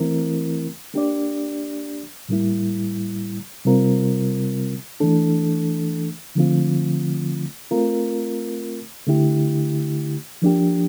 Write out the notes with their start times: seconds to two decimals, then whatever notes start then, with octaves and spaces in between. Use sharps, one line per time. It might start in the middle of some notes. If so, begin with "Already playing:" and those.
Already playing: E3 A3 C4 E4 A#4
0.94 A#3 D4 G4 D5
2.29 A2 G3 A#3 E4
3.65 C3 G3 C4 F4 A#4
5.00 E3 A3 D4 A4
6.35 D3 F3 A3 C4 F4
7.71 A3 C4 F4 A#4
9.07 D3 A3 E4 G4
10.42 F3 A#3 D4 G4